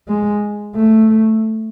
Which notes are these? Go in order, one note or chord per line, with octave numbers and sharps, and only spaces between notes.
G#3
A3